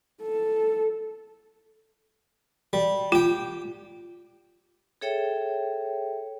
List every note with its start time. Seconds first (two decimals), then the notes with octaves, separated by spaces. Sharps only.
0.22 A4
2.73 G3
3.12 F4 G4 G5
5.01 G#4 A4 C#5 E5 G5